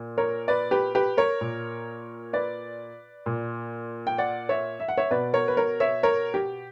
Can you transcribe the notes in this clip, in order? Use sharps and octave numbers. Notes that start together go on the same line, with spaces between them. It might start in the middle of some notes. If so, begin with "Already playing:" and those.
Already playing: A#2
A#4 C#5
B4 D5
G4 B4
G4 B4
A#4 C#5
A#2
B4 D5
A#2
G5
D5 F#5
C#5 E5
E5
F#5
C#5 E5
B2 B4 D5
A#4 C#5
B4
A#4 C#5
C#5 E5
A#4 C#5
G4